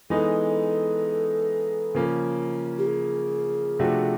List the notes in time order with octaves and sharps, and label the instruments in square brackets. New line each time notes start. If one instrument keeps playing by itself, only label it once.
[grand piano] E3 G#3 B3 D#4 [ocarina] A4
[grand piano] C#3 F3 A#3 C#4
[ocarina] G4
G#4
[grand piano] C3 F3 A3 D4 F#4